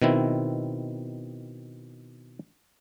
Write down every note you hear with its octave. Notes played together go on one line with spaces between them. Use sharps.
B2 D#3 C4 E4